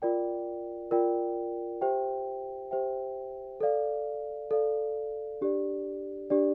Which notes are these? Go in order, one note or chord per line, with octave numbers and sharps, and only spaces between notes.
F4 A#4 D5 G5
F4 A#4 D5 G5
G4 C5 E5 G5
G4 C5 E5 G5
A4 D5 F5
A4 D5 F5
D4 G4 D5
D4 G4 D5